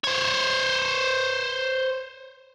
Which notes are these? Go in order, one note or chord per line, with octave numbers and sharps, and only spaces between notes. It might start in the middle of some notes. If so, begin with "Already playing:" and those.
C5 C#5